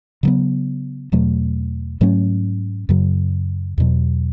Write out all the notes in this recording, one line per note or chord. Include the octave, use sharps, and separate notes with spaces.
C#3 F#3 B3
E2 B2 F#3 A3
G#2 F#3 A3 C#4
F#2 C#3 F#3
E2 B2 F#3